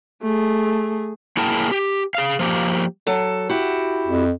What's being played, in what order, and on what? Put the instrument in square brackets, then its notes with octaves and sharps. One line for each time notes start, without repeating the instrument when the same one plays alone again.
[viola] A3 G#4
[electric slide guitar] A#3 E4 G#4 A#4 G5 A5
G4
G#4 F5
F3 A#3 G4
[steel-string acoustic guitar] F#3 A4
E4 F#4 G4
[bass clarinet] F2